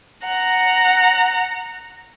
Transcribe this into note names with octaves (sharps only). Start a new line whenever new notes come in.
F#5 A#5